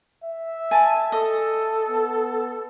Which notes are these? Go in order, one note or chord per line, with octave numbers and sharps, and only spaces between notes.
E5
G#5 A5
A4 D#5
B3